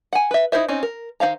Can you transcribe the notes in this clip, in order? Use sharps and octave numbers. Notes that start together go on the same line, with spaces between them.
F#5 G#5
B4 E5
D#4 E4 A4 C5 E5
C4 C#4 D#4
A#4
D#3 F#4 C5 F5 A#5